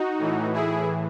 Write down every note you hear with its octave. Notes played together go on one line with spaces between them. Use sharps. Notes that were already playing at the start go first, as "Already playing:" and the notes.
Already playing: D#4 F#4
A2 E3
E4 G#4